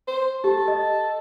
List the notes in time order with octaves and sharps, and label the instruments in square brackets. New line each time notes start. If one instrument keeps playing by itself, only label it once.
[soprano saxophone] C5
[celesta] G4 [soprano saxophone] A4
[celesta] D#5